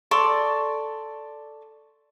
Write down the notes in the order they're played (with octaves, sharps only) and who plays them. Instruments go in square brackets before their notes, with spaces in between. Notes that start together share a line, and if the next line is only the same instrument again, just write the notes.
[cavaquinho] A4 D5 C6 C#6